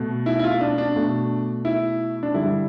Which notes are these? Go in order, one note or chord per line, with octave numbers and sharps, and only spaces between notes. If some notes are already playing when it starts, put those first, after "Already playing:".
Already playing: B2 A3
E4
E4
F4
D4
D4
B2 A3
E4
D4
G2 D3 G3 E4